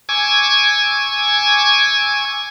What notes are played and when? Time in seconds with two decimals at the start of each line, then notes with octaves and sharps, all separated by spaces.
0.09 G#5 C#6 D6 E6 G#6